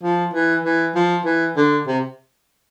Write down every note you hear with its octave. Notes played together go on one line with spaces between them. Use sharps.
F3
E3
E3
F3
E3
D3
C3